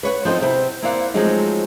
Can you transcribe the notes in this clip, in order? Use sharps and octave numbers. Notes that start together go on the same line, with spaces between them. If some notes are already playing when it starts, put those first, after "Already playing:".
B4 C#5 F#5
F3 C4 D#4 A4 C5 D#5
C3 B3 C4 E4
A#3 C4 E4 D5 F5 F#5
F3 F#3 G#3 A3 C4 D#4